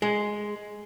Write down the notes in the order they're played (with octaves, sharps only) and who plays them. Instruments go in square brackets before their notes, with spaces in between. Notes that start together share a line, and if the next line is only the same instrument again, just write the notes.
[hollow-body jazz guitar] G#3